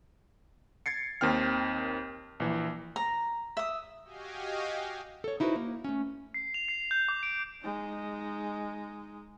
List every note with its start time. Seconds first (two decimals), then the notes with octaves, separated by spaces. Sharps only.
0.86 G#6 A6 C7 C#7
1.21 D#2 D#3 C4 G5 F6
2.40 A#1 E3
2.96 A#5
3.57 E5 D#6
4.04 F#4 G4 D#5 F5 G5 G#5
5.24 A4 C#5
5.40 D#4 E4 F#4 G#4 B4 C5
5.56 A#3
5.84 A3 C#4
6.34 C7
6.54 F7
6.68 C7
6.91 G6
7.08 D6
7.23 D7
7.62 G#3 D#4